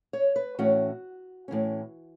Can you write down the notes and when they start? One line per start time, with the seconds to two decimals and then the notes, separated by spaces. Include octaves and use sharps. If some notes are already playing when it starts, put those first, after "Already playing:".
0.13 C#5
0.36 B4
0.59 A2 E3 C#4 F#4
1.48 A2 E3 C#4